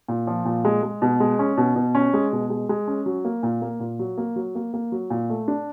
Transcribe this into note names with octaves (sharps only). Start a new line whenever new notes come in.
A#2
F3
A#2
G#3
G#3
B2
G#3
C#4
B2
B2
C#4
G#3
B2
G#3
G#3
C#4
F#3
A#3
A#2
A#3
A#2
F#3
A#3
F#3
A#3
A#3
F#3
A#2
A3
D4